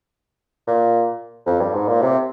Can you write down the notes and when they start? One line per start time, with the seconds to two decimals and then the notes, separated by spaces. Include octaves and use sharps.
0.67 A#2
1.46 F2
1.60 G2
1.74 G#2
1.88 A#2
2.02 C3